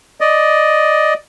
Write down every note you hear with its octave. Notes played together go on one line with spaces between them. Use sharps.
D5 D#5